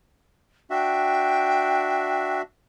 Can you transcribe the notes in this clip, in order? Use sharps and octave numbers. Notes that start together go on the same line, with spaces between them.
D4 F#4 E5 G5